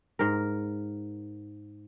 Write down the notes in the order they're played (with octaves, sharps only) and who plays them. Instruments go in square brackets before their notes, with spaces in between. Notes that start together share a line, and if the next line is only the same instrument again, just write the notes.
[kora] G#2 A#4